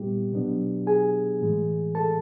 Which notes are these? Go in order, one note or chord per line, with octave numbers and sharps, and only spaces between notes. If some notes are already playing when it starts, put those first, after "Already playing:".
Already playing: A#2 G3 B3 E4 G4
B2 F#3 B3 D4
G#4 G#5
A2 E3 G#3
A4 A5